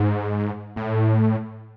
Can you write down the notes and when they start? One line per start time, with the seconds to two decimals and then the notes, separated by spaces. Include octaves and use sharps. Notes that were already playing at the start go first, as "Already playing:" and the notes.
Already playing: G#2
0.76 A2